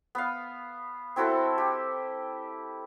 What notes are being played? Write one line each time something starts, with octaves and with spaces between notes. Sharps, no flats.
B3 F5
C4 E4 F#4 A4
G4